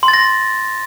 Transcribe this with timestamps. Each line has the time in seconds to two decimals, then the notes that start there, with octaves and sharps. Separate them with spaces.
0.03 C6
0.08 A6
0.14 A#6